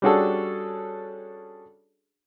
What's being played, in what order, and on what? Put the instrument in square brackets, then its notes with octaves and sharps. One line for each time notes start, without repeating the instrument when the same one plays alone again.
[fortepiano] G3 C#4 D4 F#4 G#4 A4